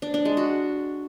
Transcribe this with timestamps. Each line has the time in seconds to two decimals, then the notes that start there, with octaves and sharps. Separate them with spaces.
0.02 D4
0.14 D4
0.25 G#3
0.37 F#4